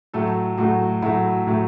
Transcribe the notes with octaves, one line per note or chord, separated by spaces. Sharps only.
A2 F#3 A3 A4
A2 F#3 A3 F#4
A2 F#3 A3 E4
A2 F#3 A3